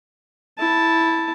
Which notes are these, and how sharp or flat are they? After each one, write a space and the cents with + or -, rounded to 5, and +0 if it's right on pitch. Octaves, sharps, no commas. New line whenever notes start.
E4 -5 A5 +0